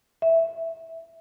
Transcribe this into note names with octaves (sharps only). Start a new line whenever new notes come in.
E5